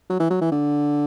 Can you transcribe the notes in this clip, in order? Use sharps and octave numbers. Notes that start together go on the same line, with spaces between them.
F#3
E3
F#3
E3
D3